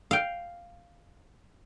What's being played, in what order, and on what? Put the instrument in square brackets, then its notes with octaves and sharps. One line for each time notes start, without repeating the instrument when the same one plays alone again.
[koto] F5 G5